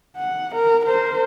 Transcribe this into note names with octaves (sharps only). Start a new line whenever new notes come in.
F#5
A#4
A#4 C5